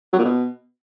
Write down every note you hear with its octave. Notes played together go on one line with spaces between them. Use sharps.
F#3
A#2
B2